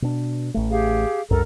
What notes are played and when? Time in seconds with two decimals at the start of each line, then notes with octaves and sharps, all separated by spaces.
0.02 B2 D4
0.54 A1 A3
0.70 G4 G#4 F5
1.31 C2 F#2 A4 A#4 A#5